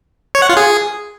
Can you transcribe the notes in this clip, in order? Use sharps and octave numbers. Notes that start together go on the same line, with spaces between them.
C#5
F#5
F4
G#4